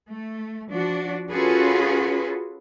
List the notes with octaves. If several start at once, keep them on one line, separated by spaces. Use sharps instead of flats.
A3
F3 D4 F#4
C#4 F4 F#4 G#4 A4 B4